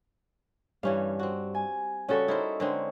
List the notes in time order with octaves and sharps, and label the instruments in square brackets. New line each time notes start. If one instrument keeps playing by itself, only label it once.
[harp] G2 [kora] E3 C#4 F5
[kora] C4 F#4
[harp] G#5
[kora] C#3 G3 F#4 [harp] C#4 A4 C#6
[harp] D#4 [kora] E4 A#4 C5
[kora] D3 G#3 C4 [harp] A#4 C#5